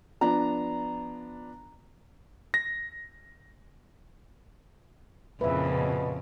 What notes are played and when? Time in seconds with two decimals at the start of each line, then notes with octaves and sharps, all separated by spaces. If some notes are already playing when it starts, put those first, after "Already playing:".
0.21 F3 B3 D4 A#5
2.54 A#6
5.41 F2 A#2 C#3 E4 B4 E5
5.71 B2